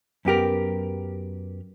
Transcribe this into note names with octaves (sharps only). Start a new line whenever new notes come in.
F#2 B3 G4 A#4